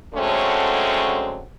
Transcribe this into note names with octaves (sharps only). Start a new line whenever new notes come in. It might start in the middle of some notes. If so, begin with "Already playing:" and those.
D3 F#3 G#3 A3 C4 C#4